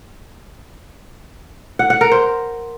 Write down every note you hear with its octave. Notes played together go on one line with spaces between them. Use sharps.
F#5
F#5
A#4
C5